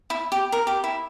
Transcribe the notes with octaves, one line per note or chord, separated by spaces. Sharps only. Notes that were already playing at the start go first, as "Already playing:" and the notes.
E4
G4
A#4
G4
E4